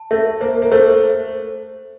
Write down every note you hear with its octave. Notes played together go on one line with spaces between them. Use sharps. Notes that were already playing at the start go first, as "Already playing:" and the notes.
Already playing: A5
A3 E5
A#3 C5
A#3
A3 C5